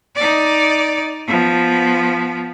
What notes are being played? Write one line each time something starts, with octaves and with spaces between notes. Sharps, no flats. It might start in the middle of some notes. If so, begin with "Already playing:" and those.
D#4 D5
F3 B3